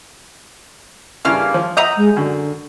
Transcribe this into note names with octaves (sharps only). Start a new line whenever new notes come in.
G2 C#3 A#3 E4 F6
F3
D#5 E5 F#5 A#5 D#6 G6
G#3
F#2 D3